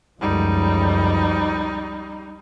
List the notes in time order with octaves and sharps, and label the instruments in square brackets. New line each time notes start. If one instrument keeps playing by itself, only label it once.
[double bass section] C#2 F#2 F3 [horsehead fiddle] G3 D#4